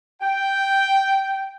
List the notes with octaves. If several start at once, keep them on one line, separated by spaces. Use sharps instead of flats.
G5